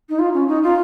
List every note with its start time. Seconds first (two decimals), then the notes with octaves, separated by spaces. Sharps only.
0.09 D#4
0.19 F4
0.34 C#4
0.48 D#4
0.63 F4